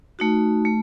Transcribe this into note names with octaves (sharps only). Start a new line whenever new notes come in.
A3 D#4 F#4
A3